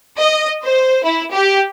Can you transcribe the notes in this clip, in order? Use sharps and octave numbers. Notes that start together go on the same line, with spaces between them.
D#5
C5
E4
G4